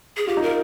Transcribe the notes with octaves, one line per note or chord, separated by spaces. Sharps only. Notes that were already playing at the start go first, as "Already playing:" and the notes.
G#4
F4 G4
D#4
F4 A#4